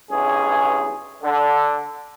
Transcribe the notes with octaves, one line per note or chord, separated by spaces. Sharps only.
B1 E2 G2 C#4 G#4
D3